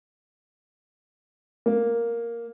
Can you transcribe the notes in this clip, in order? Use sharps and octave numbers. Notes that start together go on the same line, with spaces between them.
A#3